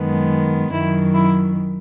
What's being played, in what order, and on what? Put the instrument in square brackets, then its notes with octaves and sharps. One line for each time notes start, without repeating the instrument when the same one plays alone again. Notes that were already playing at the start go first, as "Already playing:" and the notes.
Already playing: [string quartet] F#2 D#3 G#3 B3
F#2 D#3 F#3 E4
E4